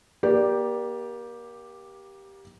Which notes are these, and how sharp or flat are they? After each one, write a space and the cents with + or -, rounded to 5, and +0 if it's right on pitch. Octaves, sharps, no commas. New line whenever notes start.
A#3 +30 G4 +0 D5 +0